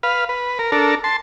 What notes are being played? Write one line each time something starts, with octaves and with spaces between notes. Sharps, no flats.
B4 F5
B4
A#4
D4 A4 A#4
A5 C6